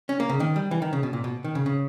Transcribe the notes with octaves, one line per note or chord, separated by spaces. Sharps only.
C#4
A#3
C#3
D#3
G3
E3
D#3
C#3
B2
A#2
B2
D#3
C#3
C#3